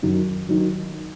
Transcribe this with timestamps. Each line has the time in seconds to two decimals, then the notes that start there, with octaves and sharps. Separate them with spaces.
0.03 F#2 D#3 F#3
0.49 D#3 F#3